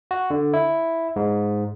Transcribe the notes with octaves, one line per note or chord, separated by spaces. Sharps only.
F#4
D3
E4
G#2